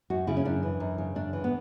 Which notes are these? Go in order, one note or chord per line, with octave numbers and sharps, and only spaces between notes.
F#2 F#4
C#3 E4
C#4
F#2 D4
E3
F#2
C#3
F#2 D4
E3
B3